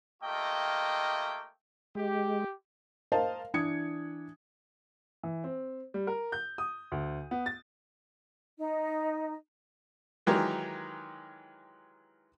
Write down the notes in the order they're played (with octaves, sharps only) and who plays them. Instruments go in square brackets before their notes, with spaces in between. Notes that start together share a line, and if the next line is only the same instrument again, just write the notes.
[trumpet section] A3 A#3 F4 G4 D#5 G5
[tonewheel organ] G#3 [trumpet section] G4
[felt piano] A#4 C5 D#5 F5 A5
E3 D4 D#6 G#6 C#7
[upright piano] E3
C4
G3
A#4
G6
D#6
D2
B3
A6
[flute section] D#4
[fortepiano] D#3 E3 F#3 G#3 G4 A#4